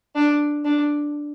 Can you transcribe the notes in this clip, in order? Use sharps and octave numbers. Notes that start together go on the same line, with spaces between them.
D4
D4